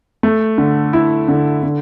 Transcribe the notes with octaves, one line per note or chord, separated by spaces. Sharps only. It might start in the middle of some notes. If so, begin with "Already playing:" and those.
A3
D3
E4
D3
D3